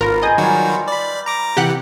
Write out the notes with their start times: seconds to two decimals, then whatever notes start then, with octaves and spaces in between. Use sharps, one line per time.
0.01 G#1 F4 A#4 B4 A#5
0.23 G#4 D#5 G5 G#5
0.38 D#3 F#3 G3 F4 F#4
0.88 D5 B5
1.26 A#5 D6 A#6
1.57 C3 E3 G4 F#5